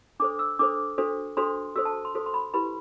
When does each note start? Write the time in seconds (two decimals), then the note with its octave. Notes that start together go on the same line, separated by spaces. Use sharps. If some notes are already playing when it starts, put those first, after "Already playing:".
0.20 D4 A4 C5 D6
0.39 E6
0.59 D4 A4 C5 D6
0.98 D4 F#4 A4 C5
1.37 D4 F#4 A4 C5 C6
1.76 F#4 A4 C5 E6
1.85 A5
2.05 C6
2.15 F#4 A4 C5
2.26 C6
2.34 B5
2.54 E4 G4 B4 B5